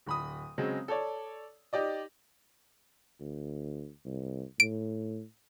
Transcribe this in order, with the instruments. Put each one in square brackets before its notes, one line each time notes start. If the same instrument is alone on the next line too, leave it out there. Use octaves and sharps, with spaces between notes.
[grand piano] D1 B5 D#6
C#3 F#3 G#3 C4
A4 C#5 D5
D#4 G4 D5 D#5
[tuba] D2
C2
[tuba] A2 [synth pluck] D7